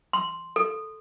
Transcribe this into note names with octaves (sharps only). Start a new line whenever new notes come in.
C6
A4